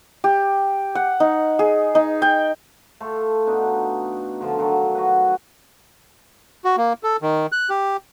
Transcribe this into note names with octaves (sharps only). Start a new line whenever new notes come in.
G4
F#5
D#4
G#4
D#4
G5
A3 F4 A4
B2 D4 D#4
D3 F3 F4
D#3 F3 F#3
F#4 B4
F#4
A#3
A4
D#3
F#6
G4